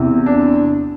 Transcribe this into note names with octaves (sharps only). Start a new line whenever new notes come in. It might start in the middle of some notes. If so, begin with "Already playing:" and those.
Already playing: E2 C3 E3
D4